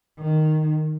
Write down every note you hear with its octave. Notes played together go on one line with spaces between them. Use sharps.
D#3